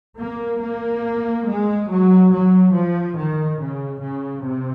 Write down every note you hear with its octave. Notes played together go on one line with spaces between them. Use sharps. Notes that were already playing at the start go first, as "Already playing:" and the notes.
A#3
A#3
G#3
F#3
F#3
F3
D#3
C#3
C#3
C3